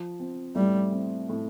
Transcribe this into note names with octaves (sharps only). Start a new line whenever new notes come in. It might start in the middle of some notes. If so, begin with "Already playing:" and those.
Already playing: F3
C4
A2 G3
C4
A2